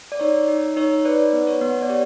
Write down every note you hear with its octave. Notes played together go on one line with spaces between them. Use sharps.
D5
D#4 C#5
D#4
D#4 C#5
B4 D5
B3
C#5
B3
D5
G4 C#5